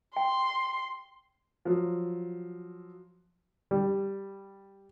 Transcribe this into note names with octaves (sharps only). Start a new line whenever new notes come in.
G5 C6
F3 F#3
G3